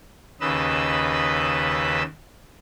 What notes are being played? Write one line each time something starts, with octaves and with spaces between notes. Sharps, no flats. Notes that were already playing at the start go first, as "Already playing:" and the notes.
D#2 C#3 B4 D#5 B5 E6